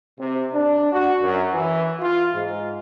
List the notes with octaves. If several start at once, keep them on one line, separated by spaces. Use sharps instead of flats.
C3
D4
F#4
F#2
E3
F4
G#2